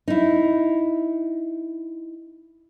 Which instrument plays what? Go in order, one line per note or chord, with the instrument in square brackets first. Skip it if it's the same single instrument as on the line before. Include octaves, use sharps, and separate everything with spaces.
[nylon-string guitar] D#4 E4